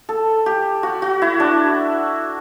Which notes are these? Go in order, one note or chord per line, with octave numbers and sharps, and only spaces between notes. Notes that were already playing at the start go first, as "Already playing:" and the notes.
A4
G4
F#4
F#4
E4
D4